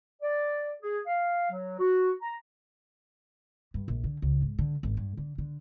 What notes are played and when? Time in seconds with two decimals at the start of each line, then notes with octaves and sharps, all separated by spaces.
0.21 D5
0.82 G#4
1.06 F5
1.51 F#3
1.79 F#4
2.22 A#5
3.74 G2
3.88 A#1
4.04 D3
4.22 C#2
4.42 G#2
4.59 D3
4.83 G#1
4.97 G2
5.17 D3
5.38 D3